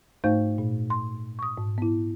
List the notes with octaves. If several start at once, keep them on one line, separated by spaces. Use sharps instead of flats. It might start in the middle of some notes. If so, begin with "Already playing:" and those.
G#2 A3 D#4 C5 F5 G6
A#2
C6
C#6 D#6
G#2
B3 E4